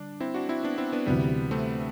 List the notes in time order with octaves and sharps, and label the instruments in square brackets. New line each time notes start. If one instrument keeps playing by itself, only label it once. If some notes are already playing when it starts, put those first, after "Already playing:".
Already playing: [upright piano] D3 G3 [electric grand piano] D4
[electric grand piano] C4 E4
D4 F#4
C4 E4
B3 D4
C4 E4
B3 D4
[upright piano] D2 C3 E3 [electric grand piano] G3 B3
[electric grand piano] A3 C4